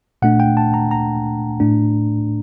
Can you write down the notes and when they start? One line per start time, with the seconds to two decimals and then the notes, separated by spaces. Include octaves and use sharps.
0.22 A#2 A3 D4 F#5
0.40 G5
0.57 A5
0.74 A#5
0.91 A#5
1.60 A2 A3 D4